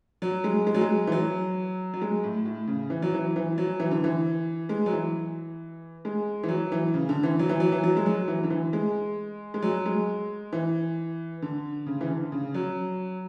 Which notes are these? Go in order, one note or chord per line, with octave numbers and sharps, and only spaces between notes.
F#3
G#3
G#3
F#3
G#3
E3
F#3
F#3
G#3
A2
A2
C#3
E3
F#3
E3
E3
F#3
E3
D3
E3
G#3
F#3
E3
G#3
E3
F#3
E3
C#3
D3
E3
F#3
E3
F#3
E3
F#3
G#3
F#3
E3
D3
E3
G#3
G#3
F#3
G#3
E3
D3
C#3
E3
D3
C#3
F#3